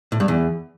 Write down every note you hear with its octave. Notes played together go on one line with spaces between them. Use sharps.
A2
G2
E2